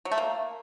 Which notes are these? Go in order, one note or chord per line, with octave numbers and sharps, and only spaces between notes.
F#3
A3
A#3